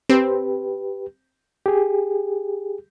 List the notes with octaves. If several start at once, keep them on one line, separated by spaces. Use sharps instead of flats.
C4 G4 B4
G4 G#4